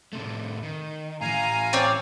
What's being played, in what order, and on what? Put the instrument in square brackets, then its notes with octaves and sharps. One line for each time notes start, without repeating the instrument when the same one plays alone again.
[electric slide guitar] A2 C3 A3
D#3
[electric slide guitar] A2 E3 [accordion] F5 G#5 A#5
[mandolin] C4 C#5 D5